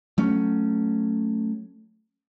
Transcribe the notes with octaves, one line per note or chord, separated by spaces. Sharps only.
F#3 A3 C#4